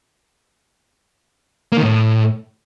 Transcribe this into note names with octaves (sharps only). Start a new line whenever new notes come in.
A#3
D#3
A2